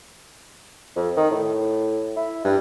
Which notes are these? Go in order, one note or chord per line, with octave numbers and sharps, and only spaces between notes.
F2
D#3
A2
E4
G2